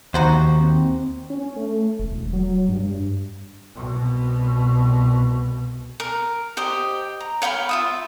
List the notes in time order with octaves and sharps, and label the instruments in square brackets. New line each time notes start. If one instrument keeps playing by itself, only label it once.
[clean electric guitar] D#2 [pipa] D#4 F#4 C5
[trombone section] C4
[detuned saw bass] C#4
A3
E1
F#3
G2
[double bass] C2 B2
[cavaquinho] A#4
G4 C5 D#5
A#5
C#5 F5 G5 B5
F4 E5 D#6